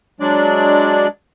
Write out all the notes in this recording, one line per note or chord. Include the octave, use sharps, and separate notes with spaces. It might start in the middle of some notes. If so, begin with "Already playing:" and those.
F#3 G#3 D4 D5